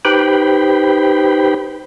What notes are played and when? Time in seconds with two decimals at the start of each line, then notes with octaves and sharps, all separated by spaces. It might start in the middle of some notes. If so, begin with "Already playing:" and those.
0.05 D#4 G4 B4 C5 G5 B5